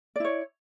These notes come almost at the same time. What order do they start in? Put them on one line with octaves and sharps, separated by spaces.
D5 E4 C#5